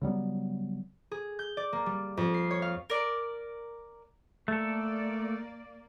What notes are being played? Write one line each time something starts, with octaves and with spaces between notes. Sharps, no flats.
C#3 F#3 G3 B3
G#4
G6
D5
A#3
G3
F2
C7
C#5
F5
A#4 D5
A3 A#3 A4 D5